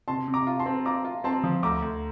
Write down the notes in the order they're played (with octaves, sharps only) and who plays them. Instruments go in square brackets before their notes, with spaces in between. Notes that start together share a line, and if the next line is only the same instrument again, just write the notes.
[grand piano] C3 [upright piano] A5 C6
[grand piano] C3
[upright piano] A#5 D6
[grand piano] F4
[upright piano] A5 C6
[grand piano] C4
[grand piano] F4 [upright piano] A#5 D6
[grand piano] F4
[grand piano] C4 [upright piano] A5 C6
[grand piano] F3
[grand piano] D2 [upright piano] A#5 D6
[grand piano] D2